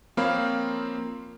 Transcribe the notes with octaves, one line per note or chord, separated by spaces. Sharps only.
F3 A#3 C4 C#5 F5 B5